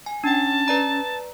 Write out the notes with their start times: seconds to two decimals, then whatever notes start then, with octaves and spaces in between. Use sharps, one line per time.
0.06 G#5
0.24 C#4 D4 G5 A5
0.68 B4 D5 A#5